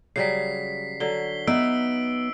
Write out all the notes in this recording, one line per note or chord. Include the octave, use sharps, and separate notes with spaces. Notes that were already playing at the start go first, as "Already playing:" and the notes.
C#3 F#3 G3 B6 C7
D3 F#3 G7
B3 D#4 E5 E6 D7